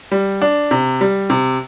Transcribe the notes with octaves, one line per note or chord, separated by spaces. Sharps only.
G3
D4
C3
G3
C3